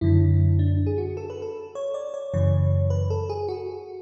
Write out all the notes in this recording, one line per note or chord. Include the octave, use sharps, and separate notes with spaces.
F#2 D3 E4
D4
G#4
F#4
A4
B4
A4
C#5
D5
C#5
F#2 C#3 E3 C#5
B4
A4
G#4
F#4